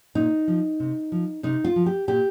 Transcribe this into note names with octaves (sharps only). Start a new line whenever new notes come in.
A#2 D#4
F3
C3
F3
C3 D#4
F4
F3
G4
A#2 G4